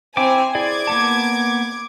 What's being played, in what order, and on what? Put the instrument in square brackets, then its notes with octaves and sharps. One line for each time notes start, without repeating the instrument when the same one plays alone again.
[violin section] C4 G#5 [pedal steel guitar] E4 G5 D6
[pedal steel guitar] E4 G#4 D5 [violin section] D6 G#6
[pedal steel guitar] A#3 B3 A5